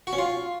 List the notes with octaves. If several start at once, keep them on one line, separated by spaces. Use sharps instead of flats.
F#4
C#4
F4